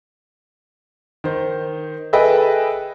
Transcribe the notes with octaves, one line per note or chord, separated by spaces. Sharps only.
D#3 C5
G#4 A4 B4 D#5 E5 G5